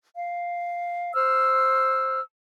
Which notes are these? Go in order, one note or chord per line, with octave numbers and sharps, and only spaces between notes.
F5
C5 E6 F6